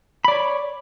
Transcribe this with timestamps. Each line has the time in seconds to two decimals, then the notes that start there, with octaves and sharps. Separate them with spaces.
0.25 B5
0.28 D5
0.32 C#5